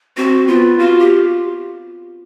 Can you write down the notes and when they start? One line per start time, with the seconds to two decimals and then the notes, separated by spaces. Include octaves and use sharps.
0.17 C4 F#4
0.48 B3 F4
0.78 F4 F#4
0.99 G4